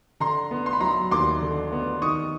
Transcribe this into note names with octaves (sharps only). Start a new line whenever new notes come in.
D3 A#5 C6
B3
C6
B5
F#3 A#5 C6
D#2 C6 D6
D3
B3
D#3 C#6 D#6